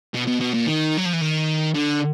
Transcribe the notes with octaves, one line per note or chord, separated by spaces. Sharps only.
B2
B2
B2
A#2
D#3
F#3
F3
E3
D#3
D3